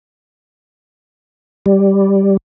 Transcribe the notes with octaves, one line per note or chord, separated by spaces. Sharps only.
G3